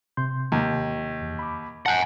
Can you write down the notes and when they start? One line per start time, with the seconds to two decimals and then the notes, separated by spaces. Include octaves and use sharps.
0.17 C3 C6 G6
0.52 D#2
1.22 E2
1.39 B5 D6
1.86 F#5 G#5 A5 F#6 G6